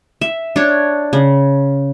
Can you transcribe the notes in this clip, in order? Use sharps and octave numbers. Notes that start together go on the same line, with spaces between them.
E5
D4 C#5
C#3